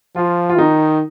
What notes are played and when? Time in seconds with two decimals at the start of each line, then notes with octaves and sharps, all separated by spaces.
0.16 F3 F4
0.49 F4
0.58 D#3 D#4